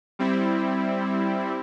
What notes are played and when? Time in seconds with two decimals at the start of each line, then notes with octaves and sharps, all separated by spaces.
0.19 G3 C4 E4